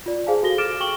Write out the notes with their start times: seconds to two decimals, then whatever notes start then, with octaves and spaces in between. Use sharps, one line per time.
0.06 F4 D5
0.27 G#4 C5 F5 G#5 A5
0.43 F#4 A4 A#6 G7
0.58 D6 F6 A6 D7 E7
0.80 G5 C#6 F#7 G7